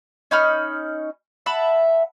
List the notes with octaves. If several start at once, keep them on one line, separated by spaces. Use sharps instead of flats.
C#4 D#4 B5 F6
E5 F#5 A5 B5